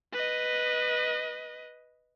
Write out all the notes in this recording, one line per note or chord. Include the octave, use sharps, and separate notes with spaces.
B4 D#5